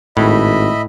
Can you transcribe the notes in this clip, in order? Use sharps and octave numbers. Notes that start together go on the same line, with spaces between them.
G#1 A2 D#5 E5 B5